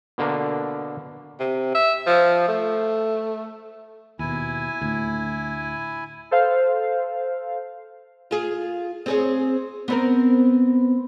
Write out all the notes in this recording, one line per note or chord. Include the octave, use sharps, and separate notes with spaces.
B2 D3 A#3
C3
E5
F3
A3
D#2 B2 E4 G#5
D2 A2
A4 C5 F5
F4 G#4
C4 G#4 C#5
B3 C4 A#4